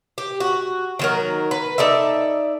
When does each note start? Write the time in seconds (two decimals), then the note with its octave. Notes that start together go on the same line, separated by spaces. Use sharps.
0.18 G4
0.40 F#4
0.99 D#3 F#3 A#4
1.51 B4
1.78 D#4 A4 D5 E5